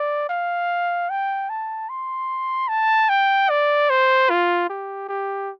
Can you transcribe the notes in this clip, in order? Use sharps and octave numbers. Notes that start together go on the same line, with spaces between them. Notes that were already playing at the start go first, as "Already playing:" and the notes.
Already playing: D5
F5
G5
A5
C6
A5
G5
D5
C5
F4
G4
G4